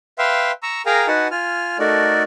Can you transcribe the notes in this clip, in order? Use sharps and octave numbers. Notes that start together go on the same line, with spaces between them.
B4 E5 F5 G5 C6
A#5 C#6 E6
G#4 A#4 F5 G5 G#5 A#5
D#4 F#4 B4 F#5 G#5 A5
F4 G#5 F6
A3 D#4 F#4 A4 A#4 D5